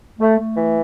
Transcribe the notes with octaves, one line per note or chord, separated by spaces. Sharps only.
A3
A3
E3